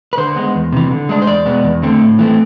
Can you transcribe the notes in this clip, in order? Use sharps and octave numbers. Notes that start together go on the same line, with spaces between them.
B4
D3 C5
G#3 B3
E2
C3 E3
D3
G#3 D4
C5
E2 D5
B2 G#3 B3
E2
D3 A3 C4
A2
E3 A3 C4